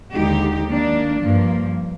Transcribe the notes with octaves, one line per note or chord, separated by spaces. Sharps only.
D#2 D3 G#3 D#4 G4
D#3 A#3 D4
G2 F3 A#3